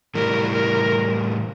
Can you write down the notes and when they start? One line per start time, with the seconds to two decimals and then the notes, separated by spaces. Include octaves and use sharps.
0.15 A2 E3 G3 A#4
0.53 A#4